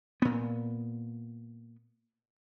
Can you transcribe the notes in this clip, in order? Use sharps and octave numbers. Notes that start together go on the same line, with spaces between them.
A#2 B3